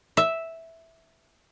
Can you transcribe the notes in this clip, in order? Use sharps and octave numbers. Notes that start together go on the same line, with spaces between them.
E5